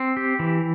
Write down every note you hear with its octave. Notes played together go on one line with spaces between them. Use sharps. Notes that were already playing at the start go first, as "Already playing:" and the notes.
Already playing: C4
G4
E3